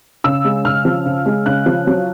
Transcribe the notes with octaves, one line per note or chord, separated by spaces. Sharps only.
C#3 E6
G#3
C#3 F6
F3
C#3
G#3
C#3 F#6
F3
F#3